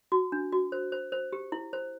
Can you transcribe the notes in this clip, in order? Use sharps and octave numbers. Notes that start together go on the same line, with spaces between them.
F#4
D4
F#4
C5
C5
C5
G4
E4
C5